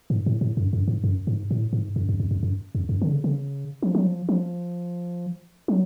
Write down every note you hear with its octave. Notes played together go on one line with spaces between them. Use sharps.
G#2
A2
A2
F#2
F#2
G#2
F#2
G#2
A2
G#2
F#2
F2
F2
F2
F#2
F2
F#2
D3
C#3
C#3
F3
F#3
F3
F3
F#3